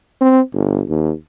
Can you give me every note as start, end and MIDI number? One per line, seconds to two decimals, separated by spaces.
0.21 0.41 60
0.52 0.82 31
0.89 1.12 39